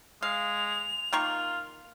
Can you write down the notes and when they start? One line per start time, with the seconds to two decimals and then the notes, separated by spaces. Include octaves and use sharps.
0.22 G#3 F5 F7
1.13 D#3 A#3 F4 C#6